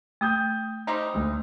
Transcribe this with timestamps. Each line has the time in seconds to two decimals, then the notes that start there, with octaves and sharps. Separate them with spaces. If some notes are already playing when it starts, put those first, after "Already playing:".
0.21 A3 G5 D#6 G6
0.87 G3 C4 D#4
1.14 D2